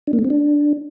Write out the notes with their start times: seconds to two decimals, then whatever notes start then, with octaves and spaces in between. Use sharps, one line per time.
0.07 D4
0.13 A#3
0.19 A3
0.25 C4
0.30 D4